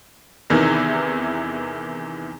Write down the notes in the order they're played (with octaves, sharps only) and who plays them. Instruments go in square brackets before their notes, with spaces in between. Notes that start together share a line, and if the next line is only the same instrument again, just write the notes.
[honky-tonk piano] E2 C3 D#3 E3